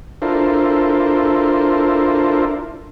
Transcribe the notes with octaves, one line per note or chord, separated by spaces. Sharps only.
D4 E4 F4 A4 A#4 C5